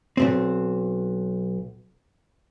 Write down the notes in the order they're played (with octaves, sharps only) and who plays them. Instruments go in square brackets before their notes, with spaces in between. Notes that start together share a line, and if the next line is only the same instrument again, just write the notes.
[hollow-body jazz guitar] B1 G#2 C4